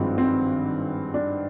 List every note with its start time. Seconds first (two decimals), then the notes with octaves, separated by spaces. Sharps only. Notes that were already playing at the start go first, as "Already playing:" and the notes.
Already playing: G#1 G2 F3 G#3 C4
0.18 C4
1.14 D4